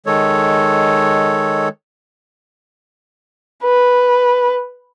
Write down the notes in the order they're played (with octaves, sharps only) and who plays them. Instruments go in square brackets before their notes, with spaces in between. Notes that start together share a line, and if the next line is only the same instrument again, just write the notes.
[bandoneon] D#3 G#3 A4 C#5
[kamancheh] B4